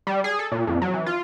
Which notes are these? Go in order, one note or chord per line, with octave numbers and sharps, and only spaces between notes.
G3
G#4
A4
A#2
F2
F#3
E3
F4